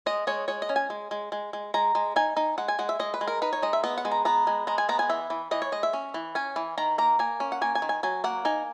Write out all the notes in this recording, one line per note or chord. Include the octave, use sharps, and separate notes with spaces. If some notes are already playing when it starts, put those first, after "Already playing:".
G#3 D#5
G#3 C#5
G#3 C#5
D#5
C#4
G#5
G#3
G#3
G#3
G#3
G#3 A#5
G#3
D#4 G#5
D#4
G#3 F#5
G#5
G#3 F#5
E5
G#3 D#5
B4
G#3
A#4
D#4 B4
C#5
G#3 D#5
E5
B3 D#5
F#5
G#3
A#5
B3 A#5
G#3
G#3 A#5
G#5
B3 A#5
G#5
E3 E5
E3
E3 D#5
C#5
G#3 D#5
E5
C#4
E3
C#4 G#5
E3
D#3 A#5
A#3 A#5
A#3 G#5
C#4
F#5
A#3 G#5
G#5
D#3
G#5
F#3 G#5
A#3 F#5
D#4 G#5